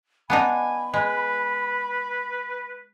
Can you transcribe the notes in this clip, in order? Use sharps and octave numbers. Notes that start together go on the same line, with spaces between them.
B3 D4 D#4 G#5 B5
G#3 B4